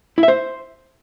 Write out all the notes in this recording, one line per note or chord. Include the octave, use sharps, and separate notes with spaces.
E4
E5
C5